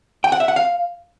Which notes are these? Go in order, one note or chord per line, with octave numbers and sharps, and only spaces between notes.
G5
F#5
E5
F#5
F5